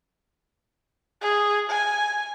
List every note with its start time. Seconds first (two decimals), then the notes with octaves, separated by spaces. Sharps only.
1.21 G#4
1.70 G#5